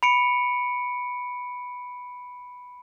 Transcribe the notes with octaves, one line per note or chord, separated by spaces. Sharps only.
B5 C#7 D7